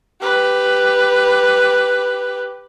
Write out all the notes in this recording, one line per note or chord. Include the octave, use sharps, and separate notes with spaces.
G4 B4